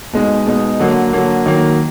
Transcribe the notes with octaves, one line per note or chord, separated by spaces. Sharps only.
B2 G#3 D#4
B2 G#3 D#4
D3 F#3 A#3
D3 F#3 A#3
D#3 F#3 A#3